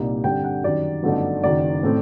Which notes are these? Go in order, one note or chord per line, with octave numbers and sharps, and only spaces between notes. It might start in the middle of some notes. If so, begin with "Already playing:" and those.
Already playing: C2 A#2 G3 A#3 D#4
G2 D3 G3 C4 G5
F#5
F#2 D#3 G3 D5
G1 F#2 D3 A3 D#4
F#1 F#2 D#3 F#3 D5
A2 A3 C4